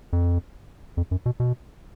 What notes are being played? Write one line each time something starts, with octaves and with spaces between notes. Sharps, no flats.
F2
F2
F#2
B2
B2